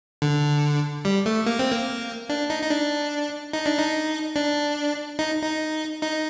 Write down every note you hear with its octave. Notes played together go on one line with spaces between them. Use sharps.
D3
G3
A3
A#3
C4
A#3
D4
D#4
D#4
D4
D#4
D4
D#4
D4
D#4
D#4
D#4